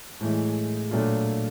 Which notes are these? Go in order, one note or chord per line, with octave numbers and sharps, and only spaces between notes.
A2 E3 G#3
A#2 F#3 A3 D4 F4